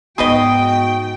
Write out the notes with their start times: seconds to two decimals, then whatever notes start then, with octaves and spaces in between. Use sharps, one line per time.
0.18 G#2 B3 D#4 F#4 G#4 B4 D#5 G5